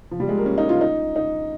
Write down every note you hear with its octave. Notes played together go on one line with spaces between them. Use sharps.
F3
G3
G#3
A#3
C#4
D#4
F4
D#4
D#4